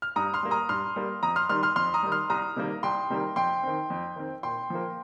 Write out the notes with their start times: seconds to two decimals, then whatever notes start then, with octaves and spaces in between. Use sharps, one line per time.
0.02 F6
0.16 G2 A#5 D#6
0.34 C6 F6
0.43 G3 A#3
0.51 A#5 D#6
0.69 G2 C6 F6
0.96 G3 A#3
1.23 F2 A#5 D#6
1.36 C6 F6
1.49 D#3 G3 C6 F6
1.63 C6 F6
1.76 F2 C6 F6
1.94 A#5 D#6
2.03 D#3 G3
2.12 C6 F6
2.29 C2 A#5 D#6
2.56 C3 D#3 G3 A#3
2.83 C2 G5 C6
3.10 C3 D#3 G3 A#3
3.36 F2 G5 C6
3.63 D#3 C4
3.90 F2
4.16 D#3 C4
4.43 A#2 G5 C6
4.70 F3 A#3